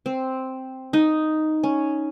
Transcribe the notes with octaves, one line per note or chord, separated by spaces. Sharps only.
C4
D#4
C#4